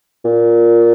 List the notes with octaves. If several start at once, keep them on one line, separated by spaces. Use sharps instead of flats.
A#2